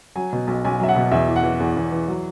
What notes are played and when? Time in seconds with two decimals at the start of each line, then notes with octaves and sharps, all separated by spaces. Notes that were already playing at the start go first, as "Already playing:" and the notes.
0.16 F#3 G#5
0.33 B2
0.47 B1
0.65 B1 G#5
0.80 F#3 E5
0.88 F#5
0.96 B2
1.12 E2 E5
1.28 E3
1.36 F#5
1.44 E3
1.60 E2
1.77 E2
1.92 E3
2.08 F#3